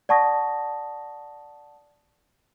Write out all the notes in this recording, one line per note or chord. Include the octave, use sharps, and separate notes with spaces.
D5 F#5 A5 C#6 D#6 A#6